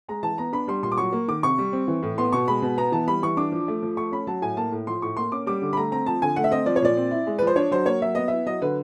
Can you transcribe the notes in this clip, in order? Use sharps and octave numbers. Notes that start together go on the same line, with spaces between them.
G#3 A#5
E3 A5
B3 A#5
D4 B5
G3 C6
A#2 C6
D6
F#3 C#6
A#3
D#3 D6
C3 C#6
G3
C4
E3
A2
B3 C6
B2 C#6
G#3 B5
B2
B3 A#5
E3 A5
G3 B5
E3 C#6
D4 D6
F3
A3
F3
A3 C#6
C#4 B5
F#3 A5
A2 G#5
A#3 A5
A2
F3 C6
A2 C#6
A#3 C6
C#4 D6
G3 D6
D3
B5
A3 A#5
C4 A#5
F3 A5
D3 G#5
A3 F#5
E5
C4 D#5
F3 D5
C#5
A#2 D5
C4
E4
G#3
F3 B4
C5
D4 C#5
F#3 C5
A#3 C#5
F#3 E5
B3 D#5
E4 E5
F#3 D#5
D3 B4